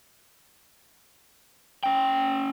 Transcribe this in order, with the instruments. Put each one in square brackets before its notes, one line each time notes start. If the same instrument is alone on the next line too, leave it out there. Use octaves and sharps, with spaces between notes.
[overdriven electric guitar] C#4 G5